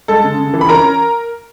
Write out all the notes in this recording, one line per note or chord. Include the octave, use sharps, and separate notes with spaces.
G#3 A4 A5
C#3
C#3
E3
B5
C#4 A#4 A#5